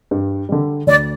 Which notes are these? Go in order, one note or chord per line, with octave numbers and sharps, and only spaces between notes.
G2
D3 G3
D2 D5